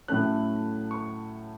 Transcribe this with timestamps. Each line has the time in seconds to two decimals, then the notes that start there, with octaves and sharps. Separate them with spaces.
0.08 A2 F#3 A3 C#4 F#6
0.91 C#6